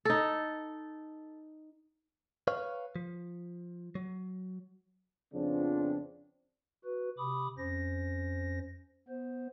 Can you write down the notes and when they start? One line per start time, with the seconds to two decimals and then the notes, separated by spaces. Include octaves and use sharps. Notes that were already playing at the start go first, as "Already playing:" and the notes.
0.05 D#4 A4
2.48 B4 C#5 F5
2.96 F3
3.95 F#3
5.34 F2 C#3 F3 B3 C4 D4
6.84 F#4 B4
7.18 C3 B5 D6 D#6
7.58 F2 C#4 C5 A#6
9.08 B3 C5